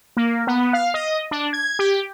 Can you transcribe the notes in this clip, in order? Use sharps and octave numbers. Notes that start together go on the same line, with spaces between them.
A#3
B3
F5
D#5
D4
G#6
G4